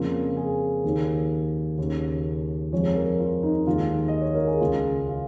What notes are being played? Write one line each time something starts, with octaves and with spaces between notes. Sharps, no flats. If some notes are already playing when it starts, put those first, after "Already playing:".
Already playing: F2 C#3 A#3 F4
G#4
D#2 D#3 A#3
D#2 C#3 A#3
F2 F3 G#3 C#5
A#4
F4
D#4
D#2 D#3 G#3 F4
D#5
C#5
A#4
G#4
C#2 C#3 G#3 F4
F4